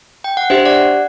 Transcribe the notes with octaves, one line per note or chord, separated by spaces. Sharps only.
G5
F#5
D4 G4 C5 E5
D5 F#5